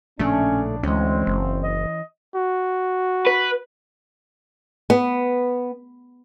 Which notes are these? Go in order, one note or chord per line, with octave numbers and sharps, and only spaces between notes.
A#1 A2 C#3 A3 C#4 D4
D2 E3 G#3 C4 C#4
F#1
D#5
F#4
B4
B3